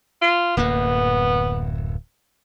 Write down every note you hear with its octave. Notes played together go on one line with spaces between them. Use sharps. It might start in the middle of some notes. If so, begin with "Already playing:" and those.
F4
D1 F#2 A#3 B3